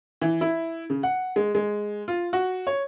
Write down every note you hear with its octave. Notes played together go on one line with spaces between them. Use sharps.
E3
E4
C#3
F#5
G#3
G#3
F4
F#4
C#5